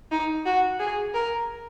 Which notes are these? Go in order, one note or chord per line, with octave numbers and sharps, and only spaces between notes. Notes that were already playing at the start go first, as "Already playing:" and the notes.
D#4
F#4
G#4
A#4